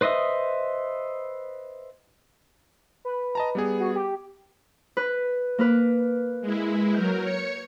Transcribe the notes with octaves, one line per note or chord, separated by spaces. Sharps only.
B4 C5 D#5 E5 D#6
B4
D#5 A5 A#5
G3 B3 G#4
F#4
G4
B4
A#3 A#4 B4
G#3 E4
F#3 A#4 G6
C#5 C#6